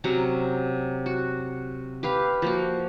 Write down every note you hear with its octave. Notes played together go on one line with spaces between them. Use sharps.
C3 F#3 C#4 A#5
F#4
G4 B4 F5
F3 A#3 F#4